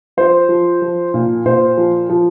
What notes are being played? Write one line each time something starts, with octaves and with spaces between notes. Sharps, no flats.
F3 C5
F3
F3
A#2
A#2 C5
F3
F3